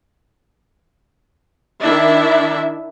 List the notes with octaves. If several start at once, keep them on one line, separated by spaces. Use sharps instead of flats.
D#3 D4 E4 E5